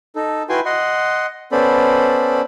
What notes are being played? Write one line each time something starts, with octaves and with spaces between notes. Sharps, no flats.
D#4 A4
E4 F#4 B4 G5 G#5 C6
D#5 F#5 C6
B3 C#4 A4 C5 D5 B5